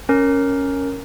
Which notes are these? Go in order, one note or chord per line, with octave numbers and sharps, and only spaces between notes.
C#4 A#4